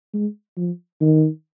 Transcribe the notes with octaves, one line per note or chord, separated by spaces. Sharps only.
G#3
F3
D#3